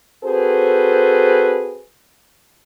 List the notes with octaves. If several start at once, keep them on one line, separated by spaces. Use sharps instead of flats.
C4 F#4 G#4 A4 B4 C5